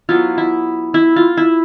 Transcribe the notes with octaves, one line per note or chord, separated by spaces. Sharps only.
F#3 B3 E4 F4
E4
E4
F4
E4